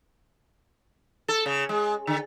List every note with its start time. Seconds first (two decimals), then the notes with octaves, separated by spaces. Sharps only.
1.28 A4
1.46 C#3
1.69 G#3
2.07 D3